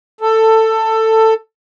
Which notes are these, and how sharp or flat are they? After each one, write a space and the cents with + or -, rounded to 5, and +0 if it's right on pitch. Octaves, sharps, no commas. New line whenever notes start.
A4 +15